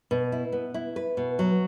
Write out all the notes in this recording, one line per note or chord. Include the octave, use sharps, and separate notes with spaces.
B2
E4
B3
E4
B4
B2
F#3